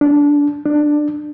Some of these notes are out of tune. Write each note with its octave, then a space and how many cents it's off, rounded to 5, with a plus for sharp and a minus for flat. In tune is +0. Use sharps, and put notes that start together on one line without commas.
D4 -15
D4 +15